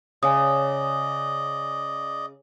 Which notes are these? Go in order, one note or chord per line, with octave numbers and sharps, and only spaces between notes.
C#3 D5 D#5 G#5 D#6